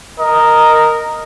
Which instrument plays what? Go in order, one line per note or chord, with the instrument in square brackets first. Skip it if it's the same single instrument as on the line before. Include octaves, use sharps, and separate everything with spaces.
[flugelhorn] A#4 [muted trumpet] D#5